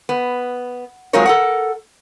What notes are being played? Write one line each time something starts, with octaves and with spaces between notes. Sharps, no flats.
B3
F#3 G#3 C4 F4 A#4 C#5
A4 A#4 F#5